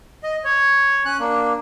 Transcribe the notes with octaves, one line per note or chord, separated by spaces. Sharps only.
D#5
C#5
C#4 F#6
A#3 D4